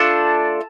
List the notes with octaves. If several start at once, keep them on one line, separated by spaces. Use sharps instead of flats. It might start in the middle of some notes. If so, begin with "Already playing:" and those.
Already playing: A3 D4 F4 A5